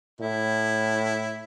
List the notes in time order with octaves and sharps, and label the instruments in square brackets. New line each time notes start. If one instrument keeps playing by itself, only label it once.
[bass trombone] A2 [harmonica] E4